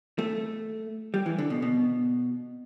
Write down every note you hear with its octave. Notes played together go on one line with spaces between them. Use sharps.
A3
G3
E3
D3
B2
B2